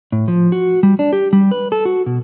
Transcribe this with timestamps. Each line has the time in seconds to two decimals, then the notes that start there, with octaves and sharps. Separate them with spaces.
0.12 A2
0.28 F3
0.52 F#4
0.83 G3
0.99 D4
1.13 G4
1.33 G3
1.51 B4
1.72 A4
1.85 F#4
2.06 B2